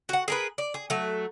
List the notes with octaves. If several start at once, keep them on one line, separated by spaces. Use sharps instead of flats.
F#4 F#5
G#4 A#4 B4
D5
G#4
F#3 A3